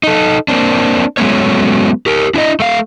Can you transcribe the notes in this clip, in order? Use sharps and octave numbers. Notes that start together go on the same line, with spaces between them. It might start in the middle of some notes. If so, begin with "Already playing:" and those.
D#4 A4
A#3 C4 D4
F#3 G#3 A3 B3 C#4 C#5
G4 A#4
D4 E4 D5 D#5
A3 F5